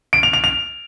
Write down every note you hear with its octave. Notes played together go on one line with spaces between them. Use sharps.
D7
F7
F7
F7